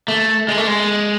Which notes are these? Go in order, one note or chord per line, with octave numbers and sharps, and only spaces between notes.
A3
G#3
A3
G#3